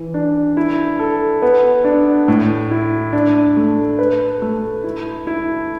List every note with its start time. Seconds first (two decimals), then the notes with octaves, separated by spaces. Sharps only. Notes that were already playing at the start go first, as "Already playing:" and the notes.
Already playing: E3
0.14 D4
0.57 E4
0.99 A4
1.42 B3
1.84 D4
2.28 A2
2.71 E4
3.13 D4
3.57 A3
3.99 B4
4.42 A3
4.84 E4
5.27 E4